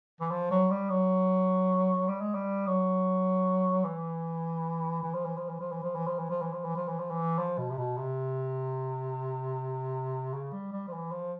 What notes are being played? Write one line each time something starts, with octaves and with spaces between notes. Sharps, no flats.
E3
F3
F#3
G3
F#3
G3
G#3
G3
F#3
E3
E3
F3
E3
F3
E3
F3
E3
F3
E3
F3
E3
F3
E3
F3
E3
F3
E3
F3
E3
F3
B2
C3
B2
C3
C#3
G3
G3
F3
E3
F3